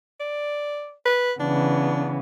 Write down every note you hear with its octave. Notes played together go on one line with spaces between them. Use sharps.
D5
B4
C#3 E3 B3 D4